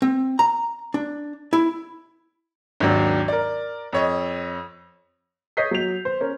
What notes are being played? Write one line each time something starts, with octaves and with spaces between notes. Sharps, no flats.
C4
A#5
D4
E4
G#1 D#2 F#3 D4
A#4 D5
F2 C#5 D#5
C#5 D#5 G6 B6 C7
F#3 F7
C5
C#4 A#4